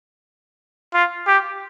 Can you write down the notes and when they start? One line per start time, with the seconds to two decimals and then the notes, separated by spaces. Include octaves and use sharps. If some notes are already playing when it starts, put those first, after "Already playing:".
0.94 F4
1.27 G4